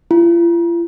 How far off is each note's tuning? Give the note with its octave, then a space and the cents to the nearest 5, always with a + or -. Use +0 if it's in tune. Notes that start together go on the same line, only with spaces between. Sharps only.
F4 -45